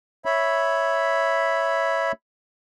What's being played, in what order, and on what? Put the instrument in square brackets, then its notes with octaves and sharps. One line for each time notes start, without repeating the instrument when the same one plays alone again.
[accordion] C#5 E5 B5